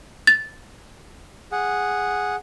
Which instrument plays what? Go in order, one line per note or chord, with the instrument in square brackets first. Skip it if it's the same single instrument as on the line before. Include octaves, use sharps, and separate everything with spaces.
[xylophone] A6
[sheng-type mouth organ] G#4 F#5